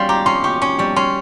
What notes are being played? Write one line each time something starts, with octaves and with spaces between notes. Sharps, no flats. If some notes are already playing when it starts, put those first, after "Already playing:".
Already playing: G3 C#4 F5 C6
G4 A#5
C#4 C6
G4 C#6
C#4 C#6
G3 C#6
C#4 C6